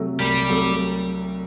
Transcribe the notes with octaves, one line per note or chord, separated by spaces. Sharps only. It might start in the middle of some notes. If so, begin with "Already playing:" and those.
Already playing: C3 F#3 A3
C2 G3
C3 F#3 A3